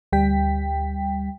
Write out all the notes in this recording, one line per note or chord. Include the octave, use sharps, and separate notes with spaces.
D2 G3 G5 B6